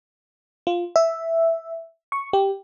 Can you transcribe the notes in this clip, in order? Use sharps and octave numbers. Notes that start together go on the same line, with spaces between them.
F4
E5
C#6
G4